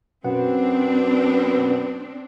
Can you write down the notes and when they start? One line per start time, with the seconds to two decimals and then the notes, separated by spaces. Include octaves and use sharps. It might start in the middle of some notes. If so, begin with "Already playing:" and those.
0.25 F#2 B2 B3 C4 D4 F#5